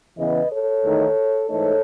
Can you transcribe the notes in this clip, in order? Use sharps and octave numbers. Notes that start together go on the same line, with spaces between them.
E2 C#3 E3 B3 B4 D#5
A4 C#5
E2 D#3 A3 D#4
G#2 E3 A3 D#4 A4 C#5